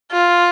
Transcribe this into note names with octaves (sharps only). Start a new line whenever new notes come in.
F4